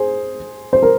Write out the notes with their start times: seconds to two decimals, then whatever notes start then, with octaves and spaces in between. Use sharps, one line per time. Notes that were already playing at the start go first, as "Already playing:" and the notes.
Already playing: G#4 C5
0.73 C5
0.83 A#4